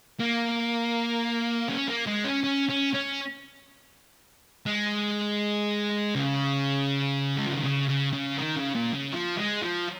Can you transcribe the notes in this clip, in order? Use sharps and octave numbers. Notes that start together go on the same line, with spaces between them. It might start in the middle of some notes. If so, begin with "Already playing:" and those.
A#3
C#4
A#3
G#3
C#4
C#4
C#4
C#4
G#3
C#3
G#3
F3
D#3
C#3
C#3
C#3
D#3
C#3
A#2
C#3
F3
G#3
F3